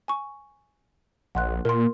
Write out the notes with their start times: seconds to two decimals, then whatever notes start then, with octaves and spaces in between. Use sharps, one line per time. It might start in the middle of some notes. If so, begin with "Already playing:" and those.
0.08 G#5 C#6
1.35 A#1 F#5 C6 F#6
1.65 A#2 A#4 C6